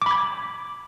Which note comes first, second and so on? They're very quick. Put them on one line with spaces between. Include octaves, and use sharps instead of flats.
D6 B5 G#6